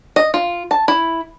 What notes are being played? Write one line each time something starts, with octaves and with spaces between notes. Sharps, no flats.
D#5
F4
A5
E4